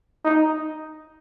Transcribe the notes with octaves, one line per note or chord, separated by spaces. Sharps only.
D#4